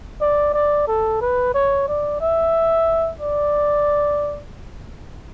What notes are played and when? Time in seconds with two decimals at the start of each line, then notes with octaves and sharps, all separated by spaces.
0.21 D5
0.54 D5
0.88 A4
1.21 B4
1.54 C#5
1.88 D5
2.21 E5
3.21 D5